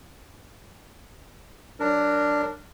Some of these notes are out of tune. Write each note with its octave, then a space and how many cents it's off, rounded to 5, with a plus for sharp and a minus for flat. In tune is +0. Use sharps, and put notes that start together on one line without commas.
F#3 +20 D4 +0 A#4 -20